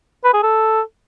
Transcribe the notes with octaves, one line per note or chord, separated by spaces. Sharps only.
B4
G#4
A4